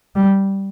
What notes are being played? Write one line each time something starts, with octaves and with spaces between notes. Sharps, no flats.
G3